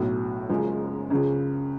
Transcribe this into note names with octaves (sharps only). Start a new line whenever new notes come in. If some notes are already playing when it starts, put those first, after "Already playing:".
Already playing: B1 A2 F#3
F#1 F#2 F3 G#3
C#2 C#3 F3